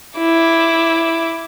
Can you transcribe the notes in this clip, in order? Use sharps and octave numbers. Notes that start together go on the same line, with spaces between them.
E4 D6